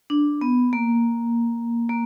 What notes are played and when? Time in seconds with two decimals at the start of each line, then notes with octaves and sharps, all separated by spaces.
0.10 D4
0.41 B3
0.73 A#3
1.89 A#3